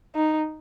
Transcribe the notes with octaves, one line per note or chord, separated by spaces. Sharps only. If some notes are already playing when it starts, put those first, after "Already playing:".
D#4